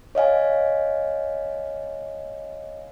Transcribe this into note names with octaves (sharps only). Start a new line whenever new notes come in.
C#5 D#5 F5 G#5